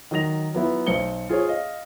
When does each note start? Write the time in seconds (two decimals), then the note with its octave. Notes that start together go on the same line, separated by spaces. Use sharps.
0.11 D#3 F#3 D#5 A#6 F7
0.55 F#3 B3 E4 F4
0.87 B1 C5 C#7 G7
1.29 F4 G#4 C5 C#5
1.47 D#5 F5